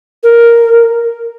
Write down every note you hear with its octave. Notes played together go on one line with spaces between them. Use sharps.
A#4